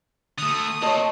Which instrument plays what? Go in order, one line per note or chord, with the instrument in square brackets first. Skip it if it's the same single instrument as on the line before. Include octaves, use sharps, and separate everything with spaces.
[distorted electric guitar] D3 A3 [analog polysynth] D#6
[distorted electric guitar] A#2 [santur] C#5 D#5 [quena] A5